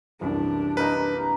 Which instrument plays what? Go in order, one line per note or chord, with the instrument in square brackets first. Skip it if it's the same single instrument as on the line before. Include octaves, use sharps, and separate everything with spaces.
[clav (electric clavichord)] C2 F#2 E3 [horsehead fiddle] D4 G4
[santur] A#3 D#4 A#4 [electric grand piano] B4